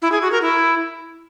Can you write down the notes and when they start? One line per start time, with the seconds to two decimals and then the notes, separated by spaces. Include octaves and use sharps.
0.02 E4
0.12 G#4
0.22 F#4
0.32 A#4
0.42 E4